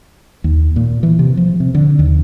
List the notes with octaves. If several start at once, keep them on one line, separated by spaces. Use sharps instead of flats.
D#2
A#2
E3
C3
F3
C3
D3
D#2